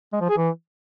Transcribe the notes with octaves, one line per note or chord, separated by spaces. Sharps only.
G#3
F3
G#4
E3